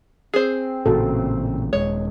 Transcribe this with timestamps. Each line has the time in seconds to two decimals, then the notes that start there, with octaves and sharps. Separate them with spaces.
0.34 C4 G#4 C5
0.86 A1 A#2 C#3 F#4 A4
1.73 D#1 G#3 C#5